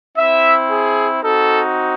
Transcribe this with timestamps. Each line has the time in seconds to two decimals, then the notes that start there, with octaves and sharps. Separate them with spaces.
0.18 C4 E4 E5
0.71 G#4
1.23 C4 D#4 F#4 A4